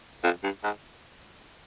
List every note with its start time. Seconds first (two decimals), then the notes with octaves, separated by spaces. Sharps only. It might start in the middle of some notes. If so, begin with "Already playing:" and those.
0.23 F2
0.43 G2
0.64 G#2